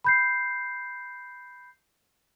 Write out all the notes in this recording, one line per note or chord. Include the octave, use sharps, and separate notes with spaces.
B5 G6 C7